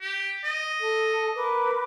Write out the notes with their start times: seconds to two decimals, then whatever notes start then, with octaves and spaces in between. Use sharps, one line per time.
0.01 G4
0.44 D#5
0.80 A4
1.35 A#4 B4 D6